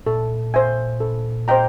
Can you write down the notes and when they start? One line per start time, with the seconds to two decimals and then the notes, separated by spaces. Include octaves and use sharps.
0.06 A#2 A4
0.54 C5 E5 G#5
1.00 A4
1.48 C5 D#5 G5 A#5